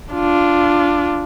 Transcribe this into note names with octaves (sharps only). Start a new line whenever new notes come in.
D4 F4